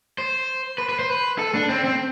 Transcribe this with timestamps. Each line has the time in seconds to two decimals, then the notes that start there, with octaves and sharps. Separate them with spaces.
0.18 C5
0.78 B4
0.89 B4
0.99 C5
1.10 B4
1.39 A4
1.55 D4
1.69 C4
1.84 C4